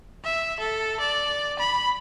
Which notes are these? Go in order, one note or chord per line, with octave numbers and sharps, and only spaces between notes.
E5
A4
D5
B5